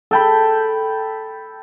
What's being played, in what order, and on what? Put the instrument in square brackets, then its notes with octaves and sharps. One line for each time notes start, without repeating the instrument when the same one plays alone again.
[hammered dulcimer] A4 G5 B5